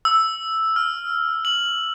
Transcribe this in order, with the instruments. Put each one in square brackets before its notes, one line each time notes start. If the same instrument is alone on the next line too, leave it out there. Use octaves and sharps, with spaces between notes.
[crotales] E6
F6
F#7